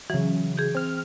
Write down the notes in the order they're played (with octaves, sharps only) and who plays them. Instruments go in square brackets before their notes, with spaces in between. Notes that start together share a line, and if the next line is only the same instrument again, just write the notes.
[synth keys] C#3 F#3 [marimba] E3
[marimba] G#4 G6
[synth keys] C4 F6